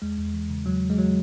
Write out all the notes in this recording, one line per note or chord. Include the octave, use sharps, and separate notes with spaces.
E2 G#3
E2
E3
C#3
E2 F#3
E2
G#3
E3 F#3